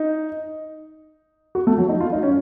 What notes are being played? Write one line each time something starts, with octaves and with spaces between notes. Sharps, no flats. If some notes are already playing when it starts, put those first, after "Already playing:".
Already playing: D#4
F#4
A3
F#3
D#4
F4
D#4
C#4